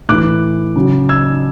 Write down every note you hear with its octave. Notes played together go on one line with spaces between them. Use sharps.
A2 E3 D6 F#6
C#3 F#3
E6 G#6